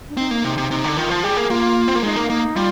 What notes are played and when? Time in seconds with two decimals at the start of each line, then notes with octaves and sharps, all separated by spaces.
0.09 D4
0.17 C4 D#4
0.31 A#3
0.44 C3 D#4
0.58 C3
0.71 C3 D#4
0.84 D3
0.97 D#3 F4
1.10 F3
1.23 G3 G#4
1.37 A#3
1.50 A#3 F4
1.88 C4
1.95 A#3
2.03 G#3 D#4
2.16 A#3
2.29 A#3 D#4
2.56 G3 F4